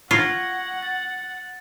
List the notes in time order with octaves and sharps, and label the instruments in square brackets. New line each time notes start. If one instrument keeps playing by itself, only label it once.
[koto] F4 [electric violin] F#5 [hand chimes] C#6 G#6 A#6
[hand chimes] A6